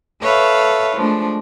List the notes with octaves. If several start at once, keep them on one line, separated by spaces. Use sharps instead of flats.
A4 B4 C#5 E5 F5
F3 G#3 A3 D4